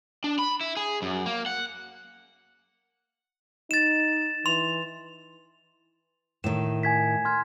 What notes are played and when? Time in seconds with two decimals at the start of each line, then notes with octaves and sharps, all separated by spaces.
0.24 D4
0.39 B5
0.61 E4
0.77 G#4
1.02 F#2
1.26 A#3
1.46 F#5
3.71 D#4 A6 E7
4.46 E3 C6 F7
6.44 A2 D#3 E7
6.83 G#5 G#6 B6
7.25 C6 F6 G#6